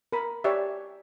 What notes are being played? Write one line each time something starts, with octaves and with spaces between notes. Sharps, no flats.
A#4 B5
G4 C#5 D5 E5